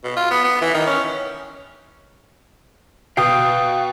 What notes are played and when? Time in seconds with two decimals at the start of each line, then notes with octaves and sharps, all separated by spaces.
0.04 B2
0.17 F4
0.31 B3
0.44 B3
0.61 E3
0.74 D#3
0.86 C#4
3.17 B2 F5 G5 D#6